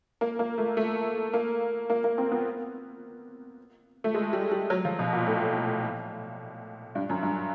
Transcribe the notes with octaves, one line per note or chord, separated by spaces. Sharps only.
A#3
A#3
A3
A3
A#3
A#3
A#3
C4
B3
A3
G#3
G3
G3
F#3
F3
B2
A#2
A2
G2
F#2
G2